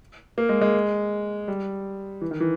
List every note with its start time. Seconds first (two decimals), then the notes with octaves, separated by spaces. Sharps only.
0.38 A#3
0.49 G#3
0.61 G#3
1.48 G3
2.22 E3
2.31 D#3
2.40 E3